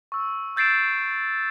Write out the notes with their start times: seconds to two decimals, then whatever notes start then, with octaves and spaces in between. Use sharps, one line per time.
0.12 C#6 E6
0.56 E6 G6 A6 C7 D7 E7